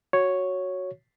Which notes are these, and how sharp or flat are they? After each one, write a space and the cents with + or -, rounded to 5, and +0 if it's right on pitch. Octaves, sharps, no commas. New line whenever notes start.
F#4 +0 C#5 +0